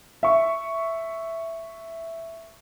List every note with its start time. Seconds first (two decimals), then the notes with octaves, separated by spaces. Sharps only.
0.23 E5 C#6